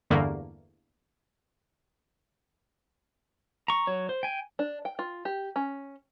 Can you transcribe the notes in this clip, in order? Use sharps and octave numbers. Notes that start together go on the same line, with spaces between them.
E2 G2 D3 A3 A#3
A#5 C#6
F#3 C#5
C5
G5 G#5
D4
G5
F4
G4
C#4